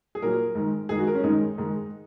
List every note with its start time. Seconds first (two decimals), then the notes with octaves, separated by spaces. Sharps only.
0.15 G#4
0.22 A#2 F#3 A#4
0.55 G#2 D#3 G#3
0.89 G#2 D#3 G#3 G#4
0.99 F#4
1.07 A#4
1.15 C#4
1.24 G#2 D#3 G#3 D#4
1.57 G#2 D#3 G#3